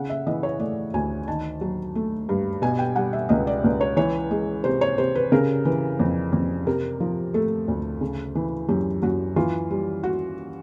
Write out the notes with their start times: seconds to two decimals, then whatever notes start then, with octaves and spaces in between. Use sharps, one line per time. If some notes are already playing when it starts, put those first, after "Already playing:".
Already playing: C#3 F#5
0.10 E5
0.27 E3 D#5
0.43 C#5
0.59 A3 D5
0.94 D2 G#5
1.27 D#3 A5
1.61 F#3
1.95 A3
2.29 G2
2.62 B2 G#5
2.79 G5
2.96 G3 F#5
3.13 E5
3.29 C#2 D#5
3.47 D5
3.64 C#2
3.81 C#5
3.96 E3 C#5
4.31 G#3
4.64 C3 C5
4.81 C#5
4.98 C3 C5
5.15 B4
5.32 C#3 A#4
5.65 E3 B4
5.99 F2
6.32 F2
6.66 C3 A#4
7.00 F3
7.34 A3 A4
7.68 D2
8.01 C#3
8.35 E3
8.69 F#2 G4
9.02 F#2 F#4
9.36 E3 F4
9.71 G3
10.03 F#4